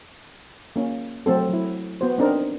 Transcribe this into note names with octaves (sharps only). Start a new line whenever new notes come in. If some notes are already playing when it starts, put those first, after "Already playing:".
A#3 C#4
F#3 A3 C4 A4
F#3 E4
B3 F#4 C5
C4 D4 D#4 A#4